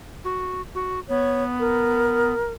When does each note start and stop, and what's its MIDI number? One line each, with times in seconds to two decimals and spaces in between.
0.24 0.61 66
0.75 1.00 66
1.09 2.33 59
1.09 1.43 73
1.60 2.52 70